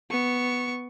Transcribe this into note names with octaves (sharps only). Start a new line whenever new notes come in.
B3 C#6